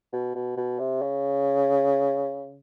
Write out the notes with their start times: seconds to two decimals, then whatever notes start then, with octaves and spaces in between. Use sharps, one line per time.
0.13 B2
0.35 B2
0.57 B2
0.79 C3
1.02 C#3